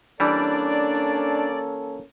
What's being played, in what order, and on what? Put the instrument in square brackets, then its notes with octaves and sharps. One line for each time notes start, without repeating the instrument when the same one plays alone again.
[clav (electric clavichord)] E3 G3 [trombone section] A#3 C#4 A4 [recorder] D4 [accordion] D5